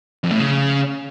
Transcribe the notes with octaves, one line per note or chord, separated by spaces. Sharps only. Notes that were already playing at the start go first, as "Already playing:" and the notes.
F2
A2
C#3